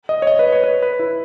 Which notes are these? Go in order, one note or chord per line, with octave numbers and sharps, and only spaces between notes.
D#5
C#5
D#5
B4
C#5
B4
B4
E4